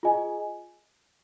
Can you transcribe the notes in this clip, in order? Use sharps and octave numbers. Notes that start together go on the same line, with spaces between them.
F4 G#4 D#5 G#5